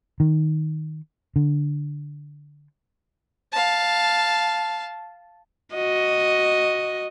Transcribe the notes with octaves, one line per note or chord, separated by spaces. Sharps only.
D#3
D3
F5 A5
F#4 D#5